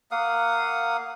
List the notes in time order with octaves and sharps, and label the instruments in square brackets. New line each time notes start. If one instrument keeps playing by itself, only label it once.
[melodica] A#3 F5 F#5 D#6